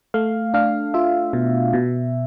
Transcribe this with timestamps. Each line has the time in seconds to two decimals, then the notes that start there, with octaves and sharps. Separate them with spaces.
0.14 A3 F5
0.54 D4 F5
0.94 F4 E5
1.33 B2
1.73 B2